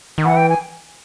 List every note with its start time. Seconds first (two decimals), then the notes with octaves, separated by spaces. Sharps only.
0.18 D#3
0.24 E3 F#5
0.36 G5
0.49 G#5